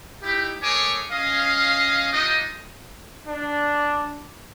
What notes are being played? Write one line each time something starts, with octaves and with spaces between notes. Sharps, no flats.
D#4 E4 G4
A3 G#4 A#4 C#5 G#5 D6
C#4 D#5 F5
D4 D#4 F4 G4 D#5
D4